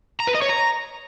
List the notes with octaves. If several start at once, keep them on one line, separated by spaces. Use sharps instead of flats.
A#5
B4
D#5
C#5
A#5